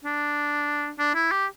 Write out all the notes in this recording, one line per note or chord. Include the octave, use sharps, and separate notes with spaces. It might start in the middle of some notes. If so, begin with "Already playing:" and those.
D4
D4
E4
G4